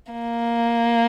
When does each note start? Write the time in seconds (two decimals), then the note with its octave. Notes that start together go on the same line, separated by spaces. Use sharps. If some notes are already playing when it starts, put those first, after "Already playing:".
0.12 A#3